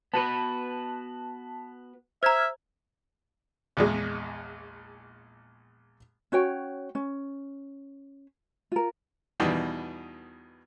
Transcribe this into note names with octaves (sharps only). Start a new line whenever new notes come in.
B3 F#4 B4 A5
C5 E5 A#5 F6 G#6
A#1 E2 G#3
C#4 F#4 C#5 G5
C#4
F4 A#4
E2 B2 D#3 G3